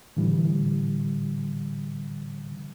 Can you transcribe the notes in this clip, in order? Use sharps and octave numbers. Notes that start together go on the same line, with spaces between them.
A2 D3 E3 G3